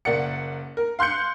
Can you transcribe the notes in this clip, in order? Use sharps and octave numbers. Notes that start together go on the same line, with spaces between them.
F#1 A#3 D5 F#5 C#7
A#4
F5 C6 F#6 G6 C#7